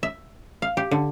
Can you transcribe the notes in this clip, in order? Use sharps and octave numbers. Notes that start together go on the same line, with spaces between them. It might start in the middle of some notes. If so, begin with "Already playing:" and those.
E5
F5
G4
D3